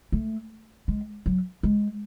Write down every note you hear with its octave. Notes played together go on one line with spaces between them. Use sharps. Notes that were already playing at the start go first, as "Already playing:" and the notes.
A3
G#3
F#3
G#3